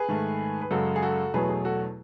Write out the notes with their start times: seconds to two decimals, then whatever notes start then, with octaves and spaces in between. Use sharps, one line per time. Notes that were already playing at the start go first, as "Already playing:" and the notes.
Already playing: G#4 B4
0.08 G#2 D#3 A3
0.61 B4
0.71 F#2 C#3 G#3 F#4 A4
0.96 G#4
1.02 F#4 A4
1.34 E2 B2 F#3 A3 G#4 B4
1.49 G#4
1.65 F#4 A4